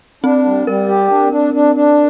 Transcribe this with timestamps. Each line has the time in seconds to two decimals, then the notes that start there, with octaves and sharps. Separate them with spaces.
0.24 C4 D4
0.45 G3
0.67 G3 A#4
0.88 G4
1.10 D4
1.32 D4
1.54 D4
1.75 D4